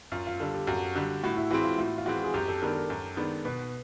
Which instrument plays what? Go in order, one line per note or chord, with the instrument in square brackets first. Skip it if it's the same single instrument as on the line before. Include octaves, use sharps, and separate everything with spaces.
[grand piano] F#2 [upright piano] F4
[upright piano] F4
[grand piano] D3 G3 [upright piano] A4
[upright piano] G4
[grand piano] F#2 [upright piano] F#4
[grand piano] D3 G3 [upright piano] G4
[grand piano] A2 [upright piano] F#4
[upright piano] E4
[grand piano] E3 G#3 C4 [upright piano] F#4
[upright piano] F4
[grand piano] A2 [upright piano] F4
[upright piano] F4
[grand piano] E3 G#3 C4 [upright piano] F#4
[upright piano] G#4
[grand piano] F#2 [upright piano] G4
[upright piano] A4
[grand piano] D#3 G#3 B3 D4 [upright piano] A#4
[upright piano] A#4
[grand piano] F#2
D#3 G#3 B3 D4
[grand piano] B2 [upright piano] B4